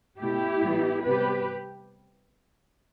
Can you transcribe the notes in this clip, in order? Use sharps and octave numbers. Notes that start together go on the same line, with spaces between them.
B2 A3 E4 G4
A2 E3 G3 B3
C3 G3 B3 G4 B4